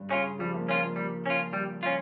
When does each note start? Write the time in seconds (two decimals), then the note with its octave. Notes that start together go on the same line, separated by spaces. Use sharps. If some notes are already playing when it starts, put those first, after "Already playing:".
Already playing: G2
0.10 C#3 C#4 F4
0.39 F3 G3
0.54 A#3
0.68 A#3 C#4 F4
0.82 A#3
0.96 G3
1.26 C#4 F4
1.53 G3
1.83 C#4 F4